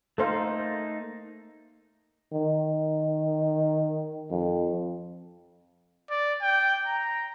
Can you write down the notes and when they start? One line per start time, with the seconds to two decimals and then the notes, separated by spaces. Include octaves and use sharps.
0.18 A3 A#3 D#4 A4 C5 F5
2.33 D#3
4.30 F2
6.10 D5
6.42 G5
6.87 A#5